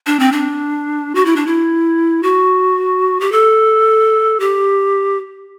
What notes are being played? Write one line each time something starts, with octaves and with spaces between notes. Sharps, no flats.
D4
C4
D4
F#4
E4
D4
E4
F#4
G4
A4
G4